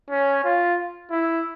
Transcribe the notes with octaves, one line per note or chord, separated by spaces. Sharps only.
C#4
F4
E4